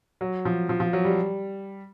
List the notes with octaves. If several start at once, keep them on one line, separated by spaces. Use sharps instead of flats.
F#3
F3
F3
F3
F#3
G3